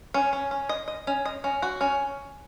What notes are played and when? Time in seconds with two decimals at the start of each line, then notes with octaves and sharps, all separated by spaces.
0.14 C#4
0.33 C#4
0.51 C#4
0.69 D#5
0.88 D#5
1.07 C#4
1.25 D#5
1.44 C#4
1.62 F#4
1.81 C#4